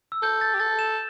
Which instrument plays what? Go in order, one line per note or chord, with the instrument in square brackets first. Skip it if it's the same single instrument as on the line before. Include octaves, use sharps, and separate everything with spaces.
[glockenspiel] E6
[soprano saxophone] A4 [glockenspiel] G6
[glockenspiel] A6
[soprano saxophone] G4
[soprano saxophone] A4 [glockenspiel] A6
[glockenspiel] E7